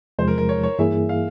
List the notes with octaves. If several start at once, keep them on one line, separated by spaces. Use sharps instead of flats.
E2 C3 F3 G#3 C5
A#4
A#4
C#5
C#5
G2 E3 A#3 E4 G#4 E5
F5